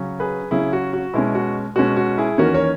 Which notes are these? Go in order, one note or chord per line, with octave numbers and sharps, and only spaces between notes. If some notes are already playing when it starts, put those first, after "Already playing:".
Already playing: C#3 F#3 C#4
G#4 B4
C#3 F#3 C#4 E4 G#4
F#4
F#4
B2 G#3 C#4 E4
F#4
B2 G#3 C#4 F#4
F#4
E4 G#4
E2 D#3 A#3 C#4 F#4 A#4
A#4 C#5